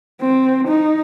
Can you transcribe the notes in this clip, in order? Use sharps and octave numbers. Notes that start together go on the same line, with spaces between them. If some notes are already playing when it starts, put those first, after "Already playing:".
C4
D#4